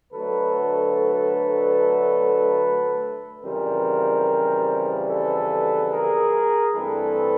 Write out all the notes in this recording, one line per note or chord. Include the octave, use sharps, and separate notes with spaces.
D2 D3 F#3 A3 A4 B4
F2 C#3 E3 G3 A#4 C5
A4 B4
G#4 A#4
G2 E3 A3 C4 A4 B4